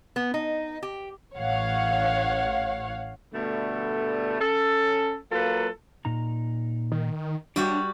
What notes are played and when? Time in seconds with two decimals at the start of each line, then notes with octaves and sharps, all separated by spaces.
0.16 B3
0.34 D#4
0.83 G4
1.36 A1 C#5 F5 F#5
3.34 B2 D3 G3 A3
4.40 C#4 A4
5.32 F#3 A#3 F4 A4 B4
6.05 A#2 D#4 A#5
6.92 D#3
7.56 G3 D4 F#4 G4 C#5 D5